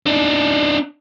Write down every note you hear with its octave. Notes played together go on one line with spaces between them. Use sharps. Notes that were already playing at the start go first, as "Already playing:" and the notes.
D4 D#4